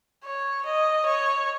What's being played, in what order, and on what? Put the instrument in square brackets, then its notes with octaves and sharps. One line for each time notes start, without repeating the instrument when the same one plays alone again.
[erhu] C#5
D#5
C#5